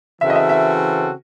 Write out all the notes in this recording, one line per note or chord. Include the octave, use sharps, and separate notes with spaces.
C#3 E3 C4 F#4 A4 E5
D#5
E5
E5